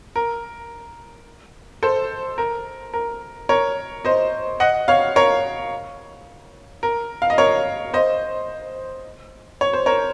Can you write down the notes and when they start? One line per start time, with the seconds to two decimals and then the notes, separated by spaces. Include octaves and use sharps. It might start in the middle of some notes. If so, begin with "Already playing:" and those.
0.16 A#4
1.83 A4 C5
2.38 A#4
2.94 A#4
3.49 A#4 C#5
4.05 C5 D#5
4.60 D#5 F#5
4.88 C#5 F5
5.16 A#4 C#5
6.83 A#4
7.22 F5
7.30 D#5
7.38 A#4 C#5
7.94 C5 D#5
9.61 C#5
9.73 C5
9.86 A#4 C#5